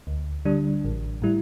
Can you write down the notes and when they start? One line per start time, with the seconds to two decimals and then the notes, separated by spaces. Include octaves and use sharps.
0.07 D2
0.45 D3 G3 D4
0.84 A1
1.22 A2 G3 E4